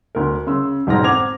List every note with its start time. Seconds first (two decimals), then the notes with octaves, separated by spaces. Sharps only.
0.15 D2 A#4
0.47 C#3 C6 E6
0.87 E1 G#2 F6 A#6
1.04 C4 F#5 D6 G#6 F7